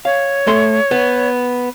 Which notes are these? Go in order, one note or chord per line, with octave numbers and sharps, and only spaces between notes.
C#5 F5
A3 A4 C6
B3